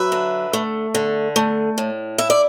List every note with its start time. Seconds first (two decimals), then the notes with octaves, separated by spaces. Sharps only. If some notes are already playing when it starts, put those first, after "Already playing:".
Already playing: F#3 B4 E5
0.12 D3
0.53 A3
0.95 D3
1.36 A3
1.78 A2
2.18 E4 E5
2.30 D5